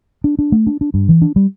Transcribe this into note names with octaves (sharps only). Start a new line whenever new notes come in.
D4
D4
A3
D4
D4
G2
E3
D4
G3